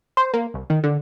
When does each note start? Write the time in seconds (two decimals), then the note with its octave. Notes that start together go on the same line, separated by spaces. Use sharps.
0.17 C5
0.34 A#3
0.54 C2
0.70 D#3
0.84 D3